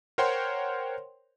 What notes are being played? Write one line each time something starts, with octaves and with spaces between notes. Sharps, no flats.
A#4 C5 C#5 F#5 G5 C6